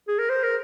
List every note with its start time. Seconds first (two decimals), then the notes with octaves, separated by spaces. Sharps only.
0.08 G#4
0.19 A#4
0.29 C5
0.43 A#4